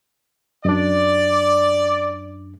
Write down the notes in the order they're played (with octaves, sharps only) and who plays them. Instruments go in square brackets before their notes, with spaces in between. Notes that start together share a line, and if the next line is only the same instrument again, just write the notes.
[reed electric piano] F#2 D4 [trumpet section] D5